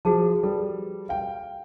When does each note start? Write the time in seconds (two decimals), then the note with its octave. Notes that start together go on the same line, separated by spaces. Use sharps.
0.05 F3 F#4 G#4 A5
0.43 G3 A4 B4
1.09 F5 G5